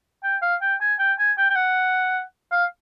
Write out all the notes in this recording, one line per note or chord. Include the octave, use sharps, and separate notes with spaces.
G5
F5
G5
G#5
G5
G#5
G5
G5
F#5
F5